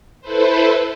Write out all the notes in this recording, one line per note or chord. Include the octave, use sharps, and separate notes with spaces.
E4 A4 B4 C5